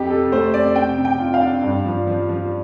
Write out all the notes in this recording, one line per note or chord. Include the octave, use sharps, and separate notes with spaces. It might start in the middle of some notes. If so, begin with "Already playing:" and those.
Already playing: F2 G4
C3 A4
A3 C5
F2 D5
C3 G5
C3
G5
F4
F5
D4
G2
F3
F3
F3